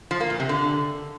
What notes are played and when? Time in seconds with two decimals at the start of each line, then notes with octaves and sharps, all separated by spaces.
0.11 F3
0.20 A#3
0.30 A#2
0.40 C3
0.49 D3